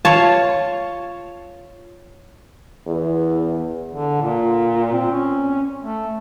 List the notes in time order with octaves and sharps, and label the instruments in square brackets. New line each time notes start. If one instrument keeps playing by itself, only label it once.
[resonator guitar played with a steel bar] F4 [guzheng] C#5 A5
[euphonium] E2
[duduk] D3
A#2
C4
C#4
A3